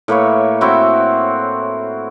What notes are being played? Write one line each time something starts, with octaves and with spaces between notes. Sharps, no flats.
A2 A#3 B4 C#5
C4 E4 F#4